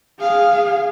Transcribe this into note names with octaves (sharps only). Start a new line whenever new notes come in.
G#4 F5